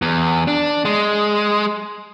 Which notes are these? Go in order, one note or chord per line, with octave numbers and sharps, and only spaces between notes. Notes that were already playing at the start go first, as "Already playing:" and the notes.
E2
D4
G#3